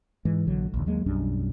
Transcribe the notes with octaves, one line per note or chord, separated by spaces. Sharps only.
G#2 E3 G#3
A#1 D3 F#3
A#1 D#2 D3
D#2 F#3 G#3 A#3
B1 F#2 G3 D4